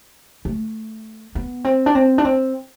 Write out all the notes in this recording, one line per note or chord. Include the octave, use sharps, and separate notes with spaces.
A3
B3
C4
D4
C4
D4
C4